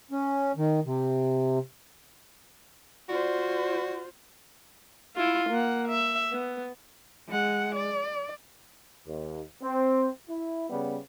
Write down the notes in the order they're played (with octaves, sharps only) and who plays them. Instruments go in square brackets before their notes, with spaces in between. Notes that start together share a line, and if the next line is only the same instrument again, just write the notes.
[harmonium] C#4
D#3
C3
[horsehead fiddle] F4 C5 [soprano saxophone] F#4 [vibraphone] D5
[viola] E4 F4
A#3 F#5
E5
B3
[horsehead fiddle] G#3 F#5
D5
[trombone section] D#2
C4
E4
C#3 G3 B3